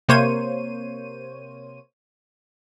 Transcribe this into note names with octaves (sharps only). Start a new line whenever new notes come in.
C3 A#3 C5 C#5 D#7